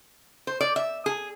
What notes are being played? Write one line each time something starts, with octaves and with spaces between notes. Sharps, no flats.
C5
D5
E5
G#4